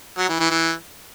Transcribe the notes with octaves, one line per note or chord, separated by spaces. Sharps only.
F#3
E3
E3
E3